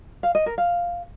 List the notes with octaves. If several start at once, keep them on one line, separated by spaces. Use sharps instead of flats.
F5
D#5
A#4
F5